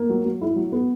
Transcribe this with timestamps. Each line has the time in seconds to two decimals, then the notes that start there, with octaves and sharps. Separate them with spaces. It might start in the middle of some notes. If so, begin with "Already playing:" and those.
Already playing: A#3
0.09 F#3
0.25 F#3
0.41 E4
0.56 F#3
0.72 B3